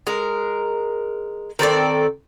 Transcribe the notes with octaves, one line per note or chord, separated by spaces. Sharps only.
G#3 A#4
D#3 C4 A4 D5